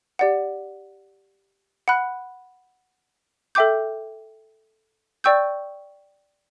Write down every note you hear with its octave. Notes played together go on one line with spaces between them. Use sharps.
G4 D5 F#5
F#5 B5 F#6
A4 E5 G5 D6 G6
D5 G5 C#6 E6 G6